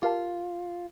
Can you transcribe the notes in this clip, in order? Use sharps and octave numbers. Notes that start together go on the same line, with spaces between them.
F4 G4 A#4 F5 A5